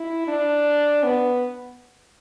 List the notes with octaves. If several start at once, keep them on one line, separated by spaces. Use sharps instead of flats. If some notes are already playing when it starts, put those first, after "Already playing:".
Already playing: E4
D4
B3